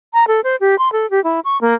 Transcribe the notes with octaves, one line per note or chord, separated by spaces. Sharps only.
A#5
A4
C5
G4
C6
A4
G4
E4
C#6
A#3